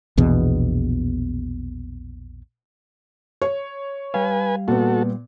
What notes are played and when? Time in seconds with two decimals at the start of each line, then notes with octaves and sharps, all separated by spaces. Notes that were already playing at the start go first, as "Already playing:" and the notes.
0.17 A#1 E2 B2
3.42 C#5
4.14 G3 B4 F5 G#5
4.68 A#2 B3 F#4 A4